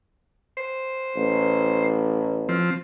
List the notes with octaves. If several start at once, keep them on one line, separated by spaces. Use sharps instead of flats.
C5
A1
F3 C4